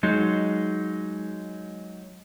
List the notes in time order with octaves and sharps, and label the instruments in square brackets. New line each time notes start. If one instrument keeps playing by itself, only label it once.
[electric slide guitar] F#3 G#3 D#4